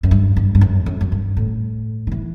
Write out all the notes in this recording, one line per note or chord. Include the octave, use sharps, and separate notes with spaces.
F#2
G2
G2
G2
F#2
F#2
F#2
G2
A2
D#3
E3